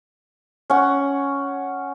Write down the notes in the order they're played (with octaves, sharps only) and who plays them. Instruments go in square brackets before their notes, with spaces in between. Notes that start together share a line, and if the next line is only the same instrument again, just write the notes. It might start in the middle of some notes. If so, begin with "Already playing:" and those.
[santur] C#4 F#5